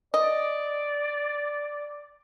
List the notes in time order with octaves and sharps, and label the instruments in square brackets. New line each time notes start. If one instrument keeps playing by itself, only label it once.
[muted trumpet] D5 [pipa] D#5